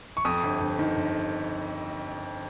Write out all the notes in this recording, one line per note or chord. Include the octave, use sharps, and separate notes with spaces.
C#6
F2 D#6
G1
G1
D#3
G1